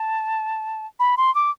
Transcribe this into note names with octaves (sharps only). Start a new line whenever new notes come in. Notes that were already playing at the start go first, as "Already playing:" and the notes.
Already playing: A5
B5
C6
D6